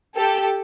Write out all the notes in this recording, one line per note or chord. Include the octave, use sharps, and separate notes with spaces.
G4 A4